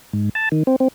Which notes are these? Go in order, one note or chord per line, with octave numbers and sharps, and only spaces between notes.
G#2
A5
D#3
C4
C4